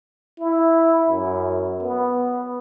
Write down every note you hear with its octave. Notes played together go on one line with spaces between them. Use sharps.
E4
F#2
B3